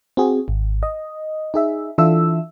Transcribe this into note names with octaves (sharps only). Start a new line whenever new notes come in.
C4 F#4 G#4
G#1
D#5
D#4 G#4 E5
E3 D4 F4 A4 E5 E6